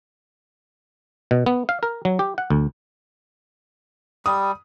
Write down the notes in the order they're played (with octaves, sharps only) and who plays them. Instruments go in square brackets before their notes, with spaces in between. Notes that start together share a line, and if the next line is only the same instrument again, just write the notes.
[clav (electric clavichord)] B2
B3
F5
A#4
F#3
G4
F#5
D2
[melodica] G3 [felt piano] D#6